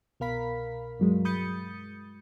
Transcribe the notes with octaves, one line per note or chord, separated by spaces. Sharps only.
C2 B2 A#4 F5 B5 B6
G2 F#3 G#3
B5 D#6 G6 A6 C#7